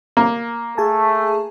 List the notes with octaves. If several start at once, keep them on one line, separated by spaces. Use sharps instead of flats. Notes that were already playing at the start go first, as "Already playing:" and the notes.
A#3
A3 G#4 G#5 A5